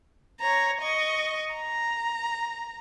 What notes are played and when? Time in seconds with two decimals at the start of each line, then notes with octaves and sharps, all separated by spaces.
0.40 C#5 A#5
0.82 D#5 C#6
1.54 A#5